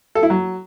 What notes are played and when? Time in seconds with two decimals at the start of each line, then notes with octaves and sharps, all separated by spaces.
0.15 A4
0.23 E4
0.30 F#3